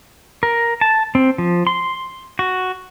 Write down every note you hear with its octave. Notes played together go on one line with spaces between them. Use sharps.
A#4
A5
C4
F3
C6
F#4